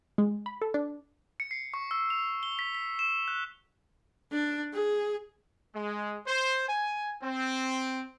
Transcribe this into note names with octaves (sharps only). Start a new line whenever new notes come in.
G#3
B5
A4
D4
C#7
C7
C#6
E6
F7
G7
B6
B6
E7
F#6
D4
G#4
G#3
C5
G#5
C4